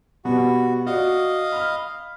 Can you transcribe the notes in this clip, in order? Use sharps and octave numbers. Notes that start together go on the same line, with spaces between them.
B2 G3 B3 F#4
F#4 D5 D#5 F5
B5 F6